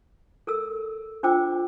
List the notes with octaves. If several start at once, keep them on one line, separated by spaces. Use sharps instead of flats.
A4 A#4 E6
D4 F4 C5 G5 D6 E6